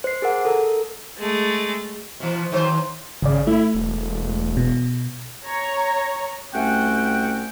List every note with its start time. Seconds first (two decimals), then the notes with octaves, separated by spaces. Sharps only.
0.04 C5 C7
0.22 G#4 A#4 F#5
0.45 A4 A#4
1.17 G#3 A3
2.20 B2 E3
2.52 D#3 F#3 C5
3.22 G#1 C#3 D5
3.47 A3 E4
3.74 E1
4.57 B2
5.46 C#5 A#5
6.54 C2 A3 C#4 F#4 F#5 G5